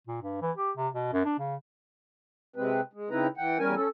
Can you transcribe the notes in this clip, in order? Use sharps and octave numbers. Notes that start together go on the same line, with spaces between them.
A#2
G2
E3
G4
C3
B2
F#2
D4
C#3
C3 G#3 C4 B4
G#3
C#3 C4 D#4 E4 B4 A#5
E3 F#5 G5
E2 G3 C#4 A#4 G#5
C#4 A4